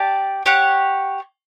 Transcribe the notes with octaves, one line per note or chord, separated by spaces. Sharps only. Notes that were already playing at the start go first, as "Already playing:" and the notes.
Already playing: G4 D5 A5
G4 C#5 F#5